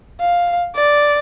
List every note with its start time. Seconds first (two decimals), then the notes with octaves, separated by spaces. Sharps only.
0.20 F5
0.75 D5